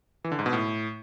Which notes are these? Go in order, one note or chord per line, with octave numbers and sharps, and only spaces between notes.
E3
D3
G#2
B2
A2